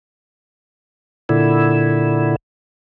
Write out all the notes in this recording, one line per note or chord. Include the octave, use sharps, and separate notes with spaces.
A#2 D3 E4